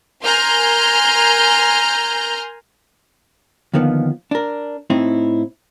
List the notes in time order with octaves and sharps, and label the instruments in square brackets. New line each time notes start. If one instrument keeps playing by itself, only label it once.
[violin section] A#4 G#5 A#5 C6 F6 G6
[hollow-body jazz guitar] D#2 D3 D#3 F3 B3
D4 A#4
A2 C4 D#4 E4